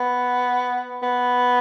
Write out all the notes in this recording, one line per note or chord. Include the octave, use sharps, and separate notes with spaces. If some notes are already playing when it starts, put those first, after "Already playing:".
Already playing: B3
B3